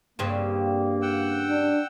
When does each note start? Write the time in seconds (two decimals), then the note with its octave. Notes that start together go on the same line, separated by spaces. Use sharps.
0.19 G2 C#3 A#3 C4
1.02 F#5 G5 E6
1.50 D4